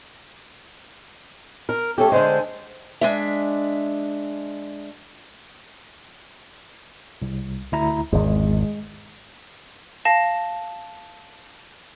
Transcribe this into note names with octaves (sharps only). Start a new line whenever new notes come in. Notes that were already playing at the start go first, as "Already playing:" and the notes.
A#4
A3 C#4 G4 A4
D3 G#3 C5
G#3 D4 E5
C2
D2 E4 A#5
G#1 E2 G#3
F5 A5 A#6